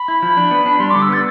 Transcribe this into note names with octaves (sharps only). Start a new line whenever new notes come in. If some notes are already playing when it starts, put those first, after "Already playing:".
Already playing: B5
E4
F3
D4
B3
D4
G3 C6
D3 D6
E6
B3 A6